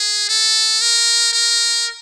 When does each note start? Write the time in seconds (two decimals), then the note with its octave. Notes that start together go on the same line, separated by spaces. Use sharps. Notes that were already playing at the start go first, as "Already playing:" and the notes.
Already playing: G#4
0.29 A4
0.82 A#4
1.33 A#4